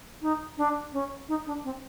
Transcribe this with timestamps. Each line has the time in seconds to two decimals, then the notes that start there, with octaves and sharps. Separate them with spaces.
0.22 D#4
0.57 D4
0.93 C#4
1.28 D#4
1.46 D4
1.64 C4